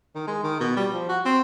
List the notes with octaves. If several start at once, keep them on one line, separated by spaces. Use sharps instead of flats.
D#3
G#3
D#3
B2
G3
F3
F#4
C4